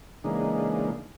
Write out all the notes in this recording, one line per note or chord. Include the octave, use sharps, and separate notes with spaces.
C#3 E3 G#3 A#3 D4 D#4